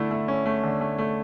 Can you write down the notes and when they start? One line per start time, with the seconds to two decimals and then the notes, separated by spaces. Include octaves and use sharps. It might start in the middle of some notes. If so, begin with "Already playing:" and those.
Already playing: D3 A3 E4
0.11 A3
0.28 C#4
0.46 A3
0.63 D3
0.81 A3
0.98 A3